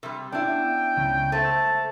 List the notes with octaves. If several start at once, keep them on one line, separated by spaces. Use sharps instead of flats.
C3 G3
B3 C#4 D4 E4 F#4 G5
C#2 C#3
A3 C5 E5 A5
E6